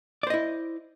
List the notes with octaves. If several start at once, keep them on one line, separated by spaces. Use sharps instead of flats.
E4 C5 D5 D#5